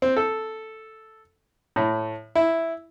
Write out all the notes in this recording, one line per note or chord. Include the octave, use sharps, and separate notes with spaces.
C4
A4
A2
E4